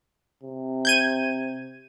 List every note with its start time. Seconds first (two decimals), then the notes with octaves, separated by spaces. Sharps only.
0.43 C3
0.85 G6 G#6 D#7